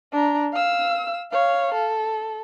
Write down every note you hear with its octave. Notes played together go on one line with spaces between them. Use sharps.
D4 A#5
F5 E6
C#5 F5
A4